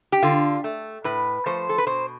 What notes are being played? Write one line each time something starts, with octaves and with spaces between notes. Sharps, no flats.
G4
D3 F4
A3
A2 B4
F3 A3 C5
A4
B4
B2 C5